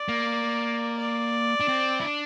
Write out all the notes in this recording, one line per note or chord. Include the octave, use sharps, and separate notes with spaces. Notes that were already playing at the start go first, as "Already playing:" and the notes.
Already playing: D5
A#3
D5
D4
C4
E4
D4